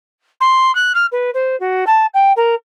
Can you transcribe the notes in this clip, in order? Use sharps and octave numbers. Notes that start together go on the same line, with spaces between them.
C6
F#6
F6
B4
C5
F#4
A5
G5
A#4